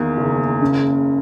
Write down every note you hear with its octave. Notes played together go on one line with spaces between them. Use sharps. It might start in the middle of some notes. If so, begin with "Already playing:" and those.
Already playing: E2 D#3 A#3
F#1
C#3